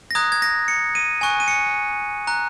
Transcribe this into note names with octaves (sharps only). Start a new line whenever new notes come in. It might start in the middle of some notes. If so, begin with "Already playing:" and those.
A#6
A#5 D#6 F#6 G#6
G#6
A#6
C#7
D#7
G#5 C#6 F#6
D#7
C#7
A#5 F#6